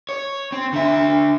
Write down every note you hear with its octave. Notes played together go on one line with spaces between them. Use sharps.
C#5
C4
D3 E5